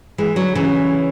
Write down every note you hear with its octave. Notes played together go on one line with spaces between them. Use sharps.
E3 G#3
D3 F#3
C#3 E3